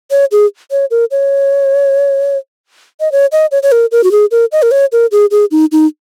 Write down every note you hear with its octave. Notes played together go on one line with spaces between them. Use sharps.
C#5
G#4
C#5
A#4
C#5
D#5
C#5
D#5
C#5
C#5
A#4
A#4
F#4
G#4
A#4
D#5
A#4
C#5
A#4
G#4
G#4
D#4
D#4